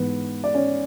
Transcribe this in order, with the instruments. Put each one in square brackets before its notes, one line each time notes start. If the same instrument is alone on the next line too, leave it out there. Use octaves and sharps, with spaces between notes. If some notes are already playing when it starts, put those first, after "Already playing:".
Already playing: [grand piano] G#2 E3 B3 B4
D5
C#4 C#5